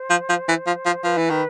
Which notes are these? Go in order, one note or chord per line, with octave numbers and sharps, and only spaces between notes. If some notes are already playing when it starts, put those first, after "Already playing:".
Already playing: C5
F3
F3
E3
F3
F3
F3 B4
E3
D#3